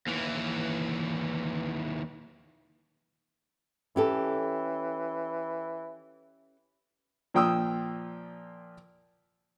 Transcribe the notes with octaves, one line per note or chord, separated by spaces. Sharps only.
D#2 E3
E3 C#4 G4 A4
A#2 F3 G5 D#6 E6